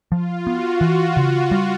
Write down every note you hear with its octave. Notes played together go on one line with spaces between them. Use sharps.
F3 F4
B3 F#4
E3
C#3
G3